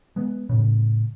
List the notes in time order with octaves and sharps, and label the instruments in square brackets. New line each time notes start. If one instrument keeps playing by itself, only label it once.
[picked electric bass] G#3 B3
A2 C#3